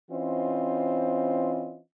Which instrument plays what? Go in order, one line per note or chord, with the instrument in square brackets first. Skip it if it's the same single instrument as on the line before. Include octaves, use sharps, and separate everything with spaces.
[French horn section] E3 C4 C#4 F4 C5 D#5